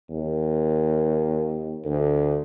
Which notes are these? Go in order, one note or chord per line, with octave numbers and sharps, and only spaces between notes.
D#2
D2